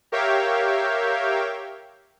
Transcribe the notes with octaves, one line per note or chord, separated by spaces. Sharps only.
G4 A#4 C#5 E5 F5 G5